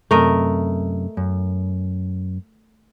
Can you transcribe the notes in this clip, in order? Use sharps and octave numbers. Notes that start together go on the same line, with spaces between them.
F#2 C3 A3 A#4 D#5
F#2